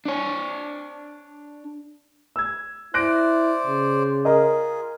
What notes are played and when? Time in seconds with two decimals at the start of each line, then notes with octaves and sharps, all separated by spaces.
0.05 D4 C#5
2.36 E6 G#6
2.94 E4 C5 D5 F#6 A#6 D7
3.67 C#3
4.25 F4 G#4 A#4 D#5